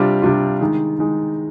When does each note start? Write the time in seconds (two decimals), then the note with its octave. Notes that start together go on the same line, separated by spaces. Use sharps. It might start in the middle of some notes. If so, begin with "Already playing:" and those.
Already playing: C3 G3 D4 F4
0.22 C3 G3 D4 F4
0.60 D#3 G#3 D#4
0.99 D#3 G#3 D#4